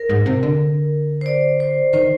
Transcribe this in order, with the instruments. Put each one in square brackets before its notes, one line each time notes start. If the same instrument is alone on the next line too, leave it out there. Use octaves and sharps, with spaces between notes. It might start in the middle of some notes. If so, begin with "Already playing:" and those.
Already playing: [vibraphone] A#4
[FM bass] G#2
C3
D3
[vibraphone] C5
D5
C5
[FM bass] D#3 [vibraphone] C5